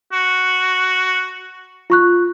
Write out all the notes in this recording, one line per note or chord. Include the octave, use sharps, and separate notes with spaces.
F#4
F4 C#6 F#6